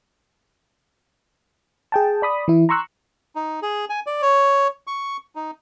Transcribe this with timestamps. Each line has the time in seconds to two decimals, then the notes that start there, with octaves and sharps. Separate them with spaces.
1.92 G#4 G5 A5
2.22 D5 B5 D#6
2.48 E3 E4
2.69 A#5 C6 C#6 E6 F#6
3.36 D#4
3.62 G#4
3.90 G#5
4.07 D5
4.22 C#5
4.87 C#6
5.36 D#4